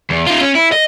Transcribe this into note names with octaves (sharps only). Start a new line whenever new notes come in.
E2
D#4 F4
C#4
E4
D#5